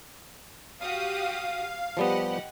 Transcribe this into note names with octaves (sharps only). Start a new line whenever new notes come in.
F#4 G4 F5 D#6
F3 G3 B3 G4 D#5 F#5